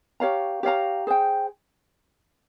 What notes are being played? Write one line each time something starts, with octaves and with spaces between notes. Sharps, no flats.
G4 C#5 F5 A#5
G4 C#5 F5 A#5
G#4 C5 G5